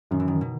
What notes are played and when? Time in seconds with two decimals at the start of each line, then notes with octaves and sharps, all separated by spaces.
0.11 F#2 D#3
0.20 E3
0.28 D#3
0.41 B2